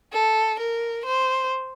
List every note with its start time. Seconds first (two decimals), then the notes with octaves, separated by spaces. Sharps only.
0.13 A4
0.59 A#4
1.06 C5